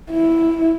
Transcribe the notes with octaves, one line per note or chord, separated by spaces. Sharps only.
E4